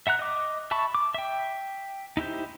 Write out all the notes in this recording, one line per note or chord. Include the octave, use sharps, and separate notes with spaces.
E5 F#5 A#5 F#6
D#5 D6
E5 A5 B5 C#6
D6
E5 G5
D#4 E4 G4 C5